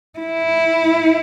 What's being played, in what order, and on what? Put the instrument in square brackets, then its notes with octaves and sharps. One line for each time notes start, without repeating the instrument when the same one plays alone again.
[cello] E4